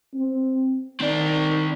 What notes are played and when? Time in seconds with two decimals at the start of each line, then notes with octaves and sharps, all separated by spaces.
0.14 C4
1.00 D#3 C4 D5